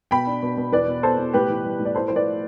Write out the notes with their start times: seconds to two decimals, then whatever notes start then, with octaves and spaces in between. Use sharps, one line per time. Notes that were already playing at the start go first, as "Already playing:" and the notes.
0.11 B2 G5 B5
0.27 D4
0.42 B2
0.57 B2
0.72 E2 B4 D5
0.87 B2
1.03 B3 A4 C5
1.18 B2
1.33 A2 G4 B4
1.49 E3
1.64 G3
1.80 A2
1.85 D5
1.95 E4 A4 C5
2.08 F3 C5
2.16 B4 D5